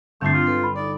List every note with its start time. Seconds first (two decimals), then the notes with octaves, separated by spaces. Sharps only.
0.21 G1 A3 C4 D4 E4 G6 A6 C7
0.33 F4
0.47 A4 B4
0.63 B5
0.76 D#4 A4 D5